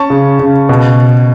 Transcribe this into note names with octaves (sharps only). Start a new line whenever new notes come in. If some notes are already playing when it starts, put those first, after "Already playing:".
Already playing: C#4 A5 C#6
C#3
C#3
B2